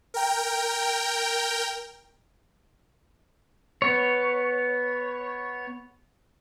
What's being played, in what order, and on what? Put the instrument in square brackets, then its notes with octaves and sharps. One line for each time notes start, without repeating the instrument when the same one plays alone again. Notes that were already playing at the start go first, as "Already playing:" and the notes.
[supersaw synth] A#4 G5
[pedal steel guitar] B3 C#5